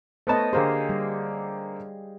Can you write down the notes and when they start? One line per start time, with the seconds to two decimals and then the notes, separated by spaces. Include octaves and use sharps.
0.27 A3 B3 C5 C#5 D#5 A5
0.53 D3 A#3 G4 G#4 C5 F5
0.89 G3